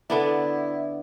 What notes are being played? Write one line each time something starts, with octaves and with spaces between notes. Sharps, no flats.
D3 B3 D4 E4